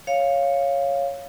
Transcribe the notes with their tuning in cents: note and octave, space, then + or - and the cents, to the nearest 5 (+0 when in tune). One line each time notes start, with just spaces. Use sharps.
C#5 +0 F5 -5